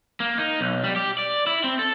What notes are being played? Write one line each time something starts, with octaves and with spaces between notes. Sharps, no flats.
A#3
D#4
B1
G3
G4
D5
E4
C4
A4